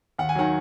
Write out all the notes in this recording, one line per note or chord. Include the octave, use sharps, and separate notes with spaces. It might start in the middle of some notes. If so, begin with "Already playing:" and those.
D#2 F#5
G#5
D#3 F#3 F#5